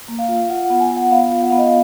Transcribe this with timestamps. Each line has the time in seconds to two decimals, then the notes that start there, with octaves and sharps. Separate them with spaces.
0.08 A#3
0.19 F5
0.29 F4
0.50 F4 F#5
0.65 F#5
0.70 B3
0.80 G#5
0.90 F4
0.97 F#5
1.11 B3 F5
1.32 F4
1.42 F#5
1.50 B3 F5
1.58 D#5
1.66 F5